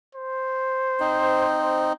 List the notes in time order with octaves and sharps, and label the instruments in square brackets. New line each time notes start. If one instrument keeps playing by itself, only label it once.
[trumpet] C5
[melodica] C4 D#4